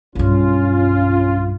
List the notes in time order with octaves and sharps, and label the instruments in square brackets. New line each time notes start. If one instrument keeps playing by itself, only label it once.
[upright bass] B1 G2 [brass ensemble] C#4 F4